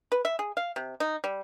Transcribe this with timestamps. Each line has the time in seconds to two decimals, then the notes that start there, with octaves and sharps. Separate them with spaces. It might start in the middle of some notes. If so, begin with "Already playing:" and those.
0.12 B4
0.25 E5
0.39 G#4
0.57 F5
0.76 C3
1.00 D#4
1.24 G3